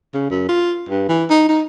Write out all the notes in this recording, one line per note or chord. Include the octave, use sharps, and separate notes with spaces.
C#3
F#2
F4
G2
E3
D#4
D#4